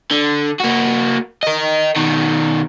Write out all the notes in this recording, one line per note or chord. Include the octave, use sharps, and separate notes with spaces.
D3
A#3 F#4
A#4 D#5
B2 D#3